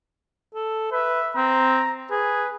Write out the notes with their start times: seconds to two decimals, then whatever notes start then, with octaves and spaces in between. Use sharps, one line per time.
0.54 A4
0.92 B4 E5
1.36 C4 A#5
2.11 G#4 B4